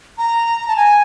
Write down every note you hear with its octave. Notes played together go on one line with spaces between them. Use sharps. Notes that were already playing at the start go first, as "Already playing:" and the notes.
A#5
A5
G#5